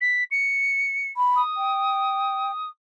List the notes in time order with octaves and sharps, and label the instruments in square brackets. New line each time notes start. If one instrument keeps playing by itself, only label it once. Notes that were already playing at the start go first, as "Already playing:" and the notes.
[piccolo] B6
C#7
[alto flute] B5
[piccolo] D#6
[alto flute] G5